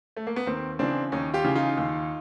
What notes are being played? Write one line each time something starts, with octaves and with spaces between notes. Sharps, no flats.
A3
A#3
B3
D#2 A#3 C4
C#3 E3 C4 D4
D#2 C#4 D#4
F4 G4
C#3 E3
D#4 F4
D#2